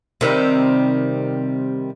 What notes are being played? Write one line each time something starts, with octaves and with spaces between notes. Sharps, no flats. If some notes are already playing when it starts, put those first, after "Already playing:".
C3 D#3 G3